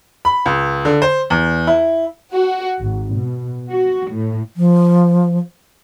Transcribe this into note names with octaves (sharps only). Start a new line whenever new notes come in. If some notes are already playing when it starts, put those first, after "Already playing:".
B5
C#2
D3
C5
E2
E4
F#4
G#1
B2
F#4
A2
F3